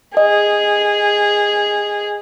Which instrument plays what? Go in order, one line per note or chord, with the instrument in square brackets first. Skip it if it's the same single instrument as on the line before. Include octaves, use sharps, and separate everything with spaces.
[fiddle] G#4 [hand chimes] D#5